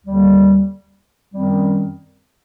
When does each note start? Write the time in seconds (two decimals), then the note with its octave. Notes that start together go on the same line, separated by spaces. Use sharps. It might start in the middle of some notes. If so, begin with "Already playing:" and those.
0.04 D#2 D3 G3
1.33 F#2 D#3 G3 C4